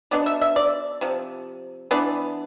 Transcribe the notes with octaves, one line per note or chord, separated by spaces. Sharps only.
B2 B3 D4 D5
E5
E5
D5
C3 F3
E3 B3 D4 D5